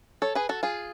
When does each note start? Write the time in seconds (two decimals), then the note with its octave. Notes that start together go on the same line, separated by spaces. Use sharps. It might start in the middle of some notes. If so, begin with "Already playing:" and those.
0.22 A4 C#5
0.35 G#4 B4
0.49 F#4 A4
0.63 F4 G#4